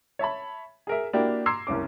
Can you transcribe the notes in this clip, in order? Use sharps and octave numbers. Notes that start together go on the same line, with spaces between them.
C#5 E5 A5 B5
G#4 A#4 E5
A#3 D4 E4 F#4 G4 A#4
A#5 C6 D6 E6 G#6 C7
F#1 C2 C#4 D6